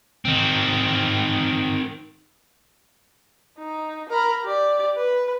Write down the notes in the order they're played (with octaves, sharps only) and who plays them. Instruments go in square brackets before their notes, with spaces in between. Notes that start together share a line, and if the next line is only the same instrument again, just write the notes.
[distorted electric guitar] D#3 C4
[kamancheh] D#4
A#4 B5
G4 D5
B4